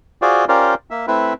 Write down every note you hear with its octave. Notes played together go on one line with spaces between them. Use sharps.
F4 F#4 G#4 C5 D5
C#4 F4 G4 A#4 C5 D5
A#3 E5
A3 C4 E4 B4